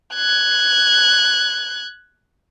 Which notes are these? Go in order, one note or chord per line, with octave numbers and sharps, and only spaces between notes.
F#6 G#6